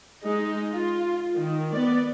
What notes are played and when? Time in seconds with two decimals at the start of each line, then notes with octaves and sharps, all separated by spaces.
0.22 G#3 D#4
0.72 F4
1.35 D#3
1.71 B3 D5